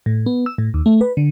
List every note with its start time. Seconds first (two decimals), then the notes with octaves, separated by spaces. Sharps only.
0.06 A2
0.26 B3
0.46 E6
0.58 A2
0.74 D#2
0.86 A3
1.01 B4
1.17 D3